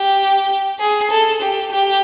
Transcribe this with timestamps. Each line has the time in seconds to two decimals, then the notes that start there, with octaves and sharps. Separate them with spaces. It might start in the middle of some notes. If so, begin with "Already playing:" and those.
Already playing: G4
0.80 G#4
1.11 A4
1.42 G4
1.72 G4